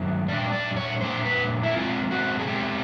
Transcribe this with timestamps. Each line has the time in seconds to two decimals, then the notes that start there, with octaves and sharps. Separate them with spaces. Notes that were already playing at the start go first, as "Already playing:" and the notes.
Already playing: G2 D#3 F#3
0.29 A#2 G3 D4 D5
0.52 D5
0.76 C#5
1.01 A#2 G3 A#3 D4 C5
1.25 B4
1.63 E4
1.74 B2 G#3 C4 F4
2.11 F#4
2.39 G#4
2.47 B2 G#3 C4 G4